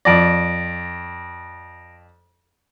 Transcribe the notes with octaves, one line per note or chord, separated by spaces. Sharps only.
F2 D5 A#6 D7